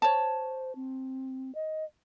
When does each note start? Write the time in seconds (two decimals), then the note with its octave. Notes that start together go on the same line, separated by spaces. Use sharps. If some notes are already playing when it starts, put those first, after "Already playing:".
0.02 C5 C#5 A5
0.75 C4
1.55 D#5